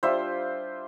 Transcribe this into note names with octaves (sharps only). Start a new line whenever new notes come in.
G3 D4 F4 C5 E5